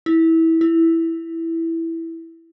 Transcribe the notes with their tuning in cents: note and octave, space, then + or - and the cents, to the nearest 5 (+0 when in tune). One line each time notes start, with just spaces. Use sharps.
E4 -20
E4 +0